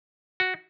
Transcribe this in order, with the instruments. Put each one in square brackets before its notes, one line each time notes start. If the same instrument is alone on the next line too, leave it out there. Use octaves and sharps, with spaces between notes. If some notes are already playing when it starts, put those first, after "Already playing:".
[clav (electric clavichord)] F#4